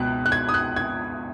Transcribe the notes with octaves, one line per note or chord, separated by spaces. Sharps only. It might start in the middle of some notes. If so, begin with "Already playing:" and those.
Already playing: C#2 B2 F#6
F#6
G#6
D#6
F#6
G#6